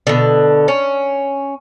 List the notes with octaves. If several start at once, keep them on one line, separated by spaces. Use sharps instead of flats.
B2 D3
C#4